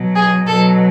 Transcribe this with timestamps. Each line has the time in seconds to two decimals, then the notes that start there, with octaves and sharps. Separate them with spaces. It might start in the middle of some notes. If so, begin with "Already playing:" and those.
Already playing: B2 F#3
0.15 G#4
0.47 B2 F#3 A4